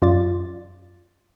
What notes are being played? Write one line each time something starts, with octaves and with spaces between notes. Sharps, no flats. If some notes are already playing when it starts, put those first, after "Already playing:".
F#2 F4 D5 A6